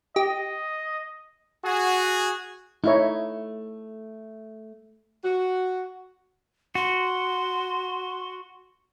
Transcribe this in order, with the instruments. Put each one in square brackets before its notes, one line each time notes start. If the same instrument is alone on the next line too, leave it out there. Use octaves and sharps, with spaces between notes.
[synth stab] G4 [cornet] D#5
[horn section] F#4 G#4
[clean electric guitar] A3 [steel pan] D#4 E4 C#5
[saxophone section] F#4
[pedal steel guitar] F#4 [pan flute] C6